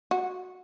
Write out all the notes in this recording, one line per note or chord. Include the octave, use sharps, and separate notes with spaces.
F#4